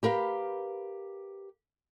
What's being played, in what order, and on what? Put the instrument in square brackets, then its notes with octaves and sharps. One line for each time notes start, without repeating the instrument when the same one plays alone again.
[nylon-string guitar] G4 A#4 B4 F5